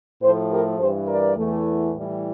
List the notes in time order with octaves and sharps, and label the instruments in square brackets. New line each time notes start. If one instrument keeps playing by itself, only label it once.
[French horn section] A2 F3 A3 A4 C5
G4 A#4
G2 E3 G3 A4 C5
A#4 D5
E2 E3 A3
A2 E3 G3